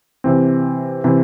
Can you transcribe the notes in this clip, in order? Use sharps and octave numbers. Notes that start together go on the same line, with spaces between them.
C3 E3 C4
C3 E3 C4